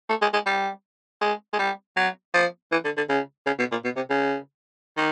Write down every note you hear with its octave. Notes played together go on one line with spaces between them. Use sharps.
A3
G#3
G#3
G3
G#3
G#3
G3
F#3
F3
E3
D3
D3
C#3
C#3
B2
A#2
B2
C3
C#3
D#3